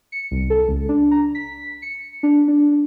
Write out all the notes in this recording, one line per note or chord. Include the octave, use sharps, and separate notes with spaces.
C#7
C2
A4
C#2
D4
A#5
B6
C#7
D4
D4